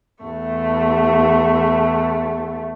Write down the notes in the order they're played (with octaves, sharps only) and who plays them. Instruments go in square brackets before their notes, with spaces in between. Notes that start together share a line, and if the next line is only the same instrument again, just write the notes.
[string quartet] E2 A3